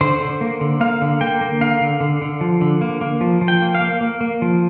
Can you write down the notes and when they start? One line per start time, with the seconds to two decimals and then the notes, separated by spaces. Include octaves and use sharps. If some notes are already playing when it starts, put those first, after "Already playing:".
0.01 D3 C5
0.21 D3
0.41 A#3
0.61 D3
0.81 A#3 F5
1.02 D3
1.21 A#3 G5
1.41 A#3
1.61 D3 F5
1.81 D3
2.00 D3
2.22 D3
2.41 F3
2.61 D3
2.81 A#3
3.01 A#3
3.21 F3
3.41 F3
3.48 G5
3.62 A#3
3.75 F5
3.81 A#3
4.01 A#3
4.21 A#3
4.42 F3